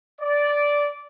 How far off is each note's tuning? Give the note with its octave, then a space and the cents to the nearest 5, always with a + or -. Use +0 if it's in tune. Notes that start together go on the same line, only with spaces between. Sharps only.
D5 -10